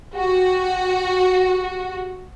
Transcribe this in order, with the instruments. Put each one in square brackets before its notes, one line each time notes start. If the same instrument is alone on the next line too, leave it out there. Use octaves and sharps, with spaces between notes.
[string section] F#4 [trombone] G4